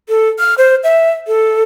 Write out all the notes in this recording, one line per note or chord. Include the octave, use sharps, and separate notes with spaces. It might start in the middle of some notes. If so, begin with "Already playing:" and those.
A4
F6
C5
E5
A4